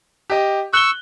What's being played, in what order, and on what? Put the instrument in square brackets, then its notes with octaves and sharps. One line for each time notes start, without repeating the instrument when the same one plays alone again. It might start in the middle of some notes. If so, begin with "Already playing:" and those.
[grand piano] G4 D#5
[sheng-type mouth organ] C#6 E6 [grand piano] F#6 G7